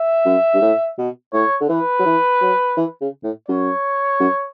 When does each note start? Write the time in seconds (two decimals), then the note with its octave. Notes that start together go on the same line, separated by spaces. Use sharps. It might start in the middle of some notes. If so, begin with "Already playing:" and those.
Already playing: E5
0.25 F#2
0.54 G2
0.62 A2
0.98 B2
1.33 A2 C#5
1.61 D3
1.69 E3 B4
1.99 F#3
2.06 E3
2.41 F#3
2.77 E3
3.01 C#3
3.24 A2
3.49 F#2 C#5
4.20 F#2